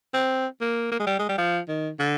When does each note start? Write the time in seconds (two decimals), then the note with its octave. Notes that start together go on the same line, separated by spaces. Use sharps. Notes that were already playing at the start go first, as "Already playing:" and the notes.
0.14 C4
0.61 A#3
0.91 A#3
1.00 G#3
1.07 G3
1.19 G#3
1.29 G3
1.38 F3
1.69 D#3
1.99 D3